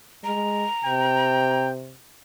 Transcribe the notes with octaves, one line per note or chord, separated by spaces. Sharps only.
G#3 A#5
C3 G5